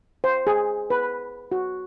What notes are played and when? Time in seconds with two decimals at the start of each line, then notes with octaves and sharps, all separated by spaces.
0.24 C5
0.47 G#4
0.90 B4
1.52 F#4